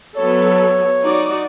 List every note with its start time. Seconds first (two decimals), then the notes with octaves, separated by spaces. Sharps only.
0.17 F#3 B3 A4 C#5
1.03 D#4 F#4 D5